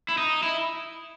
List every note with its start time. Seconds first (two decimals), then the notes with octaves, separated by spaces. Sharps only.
0.09 E4
0.18 D#4
0.43 E4